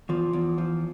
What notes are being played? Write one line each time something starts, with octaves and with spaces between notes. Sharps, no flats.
E2 F3
E2
F3